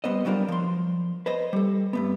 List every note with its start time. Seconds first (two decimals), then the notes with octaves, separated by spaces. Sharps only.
0.04 G3 B3 C5 D#5
0.25 F#3 G3 D4 F4 A#4
0.48 F3 C6
1.26 B4 C5 D#5
1.53 G3 A4
1.93 G2 A3 B3